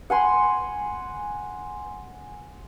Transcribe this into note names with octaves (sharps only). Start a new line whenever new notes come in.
F#5 G#5 C6